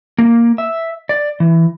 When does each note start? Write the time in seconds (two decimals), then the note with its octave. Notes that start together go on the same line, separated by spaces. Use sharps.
0.18 A#3
0.58 E5
1.09 D5
1.40 E3